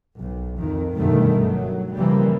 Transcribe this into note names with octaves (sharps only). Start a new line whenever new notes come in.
B1
F2 D#3
G1 F#2 B2 D#3 G3 A3
F#3
C#3 E3 F3 G3 A#3